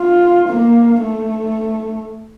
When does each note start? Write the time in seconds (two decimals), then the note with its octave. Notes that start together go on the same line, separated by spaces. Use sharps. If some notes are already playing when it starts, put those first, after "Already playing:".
Already playing: F4
0.48 A#3
1.01 A3